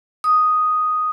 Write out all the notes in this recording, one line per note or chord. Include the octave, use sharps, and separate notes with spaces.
D#6